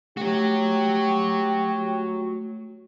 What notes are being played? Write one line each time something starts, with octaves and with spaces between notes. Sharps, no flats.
A3 F#4 G4 C#5